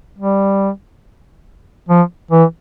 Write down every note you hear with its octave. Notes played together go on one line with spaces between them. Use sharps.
G3
F3
E3